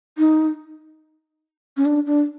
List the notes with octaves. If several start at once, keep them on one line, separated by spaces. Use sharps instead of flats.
D#4
C#4
D4
D4